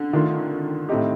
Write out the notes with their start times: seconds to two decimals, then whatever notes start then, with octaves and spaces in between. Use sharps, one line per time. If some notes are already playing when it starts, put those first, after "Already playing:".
Already playing: D3
0.13 D#3 A3 D4 F4
0.89 A2 A3 C4 D#4 G4